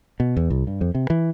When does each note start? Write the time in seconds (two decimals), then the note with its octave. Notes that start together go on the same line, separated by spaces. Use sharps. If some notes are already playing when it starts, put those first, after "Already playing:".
0.20 B2
0.37 E2
0.50 C2
0.67 G2
0.81 F2
0.95 C3
1.10 E3